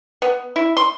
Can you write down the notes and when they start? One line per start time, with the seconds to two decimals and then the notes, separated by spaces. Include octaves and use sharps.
0.22 B3
0.56 E4
0.77 C6